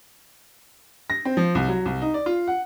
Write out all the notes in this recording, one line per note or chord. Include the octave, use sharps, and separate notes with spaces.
A#6
C4
F3
C2
F#3
C2
D#4
D5
F4
F#5